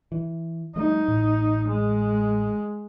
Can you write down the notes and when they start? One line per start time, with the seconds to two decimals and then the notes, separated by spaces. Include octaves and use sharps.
0.12 E3
0.76 F3 G3 A3 D#4
1.08 A1 A2
1.68 G#3